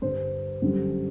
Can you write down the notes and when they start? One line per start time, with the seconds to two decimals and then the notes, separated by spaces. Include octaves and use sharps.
0.02 G2 D3 G3 C5
0.62 F#2 D3 G3